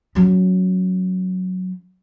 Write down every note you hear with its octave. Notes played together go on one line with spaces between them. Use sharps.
F#3 C#4